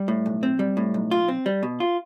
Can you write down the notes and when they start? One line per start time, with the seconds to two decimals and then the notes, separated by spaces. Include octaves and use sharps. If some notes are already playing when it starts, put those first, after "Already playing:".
Already playing: G3
0.08 A2
0.26 B1
0.43 C4
0.59 G3
0.77 A2
0.94 B1
1.11 F4
1.28 C4
1.46 G3
1.63 B2
1.80 F4